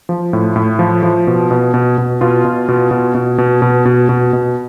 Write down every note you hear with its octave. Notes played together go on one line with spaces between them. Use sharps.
F3
A2
A2
F3
F3
B2
B2
B2
B2
B2 F4
B2
B2
B2
B2
B2
B2
B2
B2
B2